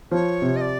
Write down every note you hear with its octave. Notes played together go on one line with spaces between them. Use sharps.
F3 C#5
C3
D#5
D5